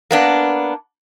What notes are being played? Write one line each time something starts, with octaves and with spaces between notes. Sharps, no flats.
A#3 B3 D4